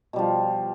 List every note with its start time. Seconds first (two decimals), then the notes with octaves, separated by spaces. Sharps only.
0.13 B2
0.16 G3
0.19 F3